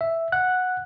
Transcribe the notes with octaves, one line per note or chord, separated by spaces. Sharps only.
E5
F#5 F#6